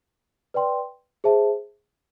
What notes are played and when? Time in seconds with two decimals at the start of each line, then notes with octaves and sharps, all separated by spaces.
0.54 B4 D5 G5 C6
1.24 G#4 C5 E5 A5